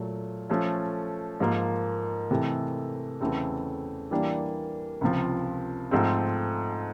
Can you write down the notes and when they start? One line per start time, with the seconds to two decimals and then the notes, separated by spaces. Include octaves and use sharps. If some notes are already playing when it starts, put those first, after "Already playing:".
Already playing: A#2 F#3 A3
0.50 F3 A3 C#4
1.40 G#2 F3 A#3
2.31 C3 E3 A3
3.21 E2 C#3 E3 A3 C4
4.11 E3 G3 A#3 D4
5.01 C#2 C3 F3
5.91 G#2 F3 A3 C4